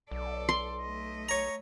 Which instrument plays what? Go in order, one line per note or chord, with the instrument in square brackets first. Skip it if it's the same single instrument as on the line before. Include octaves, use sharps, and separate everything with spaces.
[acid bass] B1 [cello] A4 D5
[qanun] C6
[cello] A3 D#5
[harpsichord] C#5 A#5